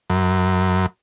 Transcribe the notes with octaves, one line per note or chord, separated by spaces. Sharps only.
F#2